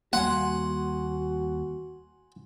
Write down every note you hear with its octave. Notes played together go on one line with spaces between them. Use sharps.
D#2 G3 A#3 F#4 F#5 G#5 C6